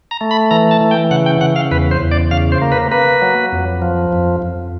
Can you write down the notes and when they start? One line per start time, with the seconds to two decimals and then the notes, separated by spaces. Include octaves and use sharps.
0.11 A#5
0.21 A3
0.31 B5
0.51 E3 A#5
0.71 A5
0.81 E3
0.91 G5
1.11 C#3 F#5
1.26 G5
1.41 C#3 F#5
1.56 F5
1.71 E2 B4
1.91 C5
2.02 E2
2.11 D5
2.31 C#3 F5
2.52 C5
2.62 A#3
2.72 B4
2.91 A#3 B4
3.22 F#3
3.52 F2
3.82 F3
4.13 F2
4.42 F2